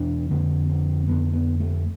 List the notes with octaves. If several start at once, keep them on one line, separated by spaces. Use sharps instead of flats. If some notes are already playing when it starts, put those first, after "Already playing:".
Already playing: E2 B2 D4
F2 D3 C4
C4
F2 D3 B3
B3
A3